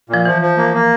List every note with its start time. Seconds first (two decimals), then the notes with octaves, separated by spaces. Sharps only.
0.09 A#2 F3
0.25 E3 F3
0.42 F3
0.57 A#3
0.74 A#3